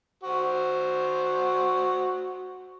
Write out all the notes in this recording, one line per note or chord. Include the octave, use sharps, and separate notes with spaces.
F#4 C5